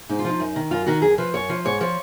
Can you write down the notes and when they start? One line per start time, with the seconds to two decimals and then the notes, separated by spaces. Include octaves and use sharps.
0.09 G#2 D#4
0.19 F4
0.25 F3 D#4
0.40 F#2
0.56 D#3
0.71 F#2 F4
0.86 D#3 F#4
1.02 F#2 G#4
1.18 F3 B4
1.34 F#2 C#5
1.50 F3
1.65 G#2 C#5
1.81 F3 C#5